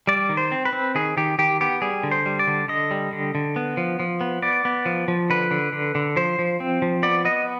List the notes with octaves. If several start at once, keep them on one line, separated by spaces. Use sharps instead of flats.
G3 D5
D#3
C5
C4
B4
C4
D#3 G#4
D#3 G4
D#3 G4
B3 G4
G3 G#4
D3
C5
G3
D5
D3
D3 D#5
G3
D3
D3
B3
F3
F3
B3
B3 D5
B3
F3
F3
D3 B4
D3
D3
D3
F3 C5
F3
C4
F3
B3 D5
B3 D#5